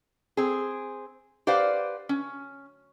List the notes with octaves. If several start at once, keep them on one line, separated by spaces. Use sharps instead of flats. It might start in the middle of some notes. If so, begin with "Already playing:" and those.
C4 G#4
G4 B4 C5 D5 F5 F#5
C#4